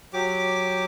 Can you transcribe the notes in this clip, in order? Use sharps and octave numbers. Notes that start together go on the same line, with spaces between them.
F#3 G4 D6